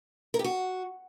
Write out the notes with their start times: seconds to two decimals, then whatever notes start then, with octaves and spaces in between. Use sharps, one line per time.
0.34 A#4
0.39 G4
0.44 F#4